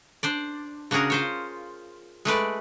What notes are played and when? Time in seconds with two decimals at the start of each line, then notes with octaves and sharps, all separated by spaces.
0.23 D4 C5 D5
0.91 C#3 D4 F#4 G#4 A#4
1.10 F4 C5 C#5
2.25 G#3 A3 B4 D5